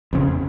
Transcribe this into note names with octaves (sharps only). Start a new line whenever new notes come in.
F2 C#3